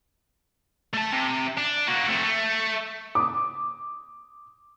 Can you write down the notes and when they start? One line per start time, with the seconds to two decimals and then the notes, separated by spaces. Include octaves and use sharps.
0.94 A3 A5
1.12 C3
1.57 D4
1.87 A#3 F#4
2.08 A3 C4
2.24 A3
3.15 D6 D#6